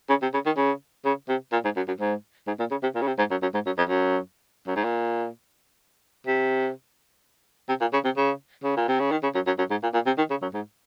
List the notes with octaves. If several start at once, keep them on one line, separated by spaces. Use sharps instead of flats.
C#3
C3
C#3
D#3
C#3
C#3
C3
A#2
G#2
F#2
F#2
G#2
G#2
A#2
C#3
C3
A#2
C#3
C3
G#2
F#2
F#2
G#2
F#2
F2
F#2
F#2
G#2
A#2
C3
C3
A#2
C#3
C3
C#3
C#3
A#2
C3
C#3
D#3
C#3
F#2
F#2
F#2
G#2
A#2
A#2
C3
D#3
C#3
F#2
G#2